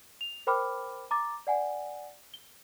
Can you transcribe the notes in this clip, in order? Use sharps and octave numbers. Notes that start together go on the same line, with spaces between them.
F7
A#4 C5 G5 B5 D6 F6
A#5 D6 A6
D5 F#5 G#5
G7